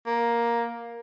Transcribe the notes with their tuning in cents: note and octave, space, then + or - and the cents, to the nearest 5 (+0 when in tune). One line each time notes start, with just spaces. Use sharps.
A#3 +10